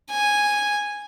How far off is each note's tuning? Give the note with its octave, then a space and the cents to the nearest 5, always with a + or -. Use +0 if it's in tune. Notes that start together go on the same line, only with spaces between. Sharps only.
G#5 -5